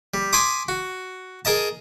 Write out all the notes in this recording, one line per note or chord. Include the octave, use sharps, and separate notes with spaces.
G3
G#5 B5 C6 D6 D#6
F#4
G#4 A#4 D#5 A5